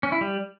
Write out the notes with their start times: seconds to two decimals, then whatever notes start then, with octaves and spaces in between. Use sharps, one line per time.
0.03 C#4
0.12 E4
0.21 G3